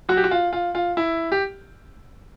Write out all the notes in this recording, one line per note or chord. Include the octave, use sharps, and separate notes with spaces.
F#3 F#4
G4
F#4
F4
F4
F4
E4
G4